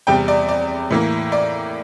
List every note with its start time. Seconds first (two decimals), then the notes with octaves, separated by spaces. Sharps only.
0.07 E2 C3 G3 G5
0.28 D5
0.49 D5
0.90 A2 E3 A#3
1.32 D5